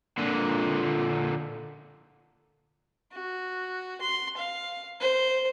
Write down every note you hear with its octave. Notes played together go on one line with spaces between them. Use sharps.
A#2 D3
F#4
C6
F5
C5